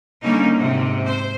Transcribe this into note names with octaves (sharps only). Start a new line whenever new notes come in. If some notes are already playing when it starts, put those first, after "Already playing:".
D3 G3 A#3 C#4 D#4
G#2 C3
C5